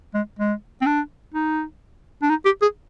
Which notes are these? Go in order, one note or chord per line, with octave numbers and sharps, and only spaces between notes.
G#3
G#3
C4
D4
D#4
D4
D#4
G4
G#4